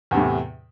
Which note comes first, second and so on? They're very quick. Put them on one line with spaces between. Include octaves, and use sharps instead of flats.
E2 C3 A2